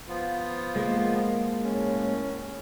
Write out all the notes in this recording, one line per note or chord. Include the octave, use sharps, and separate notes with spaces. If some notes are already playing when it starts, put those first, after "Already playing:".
F3 B3 F4
G#3 A#3
A2 C#4